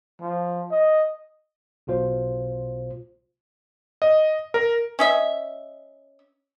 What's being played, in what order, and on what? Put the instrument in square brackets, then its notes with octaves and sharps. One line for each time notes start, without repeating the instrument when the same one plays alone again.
[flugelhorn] F3
D#5
[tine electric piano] B1 B2 F4 C5
[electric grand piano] D#5
A#4
[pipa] C#4 D#5 E5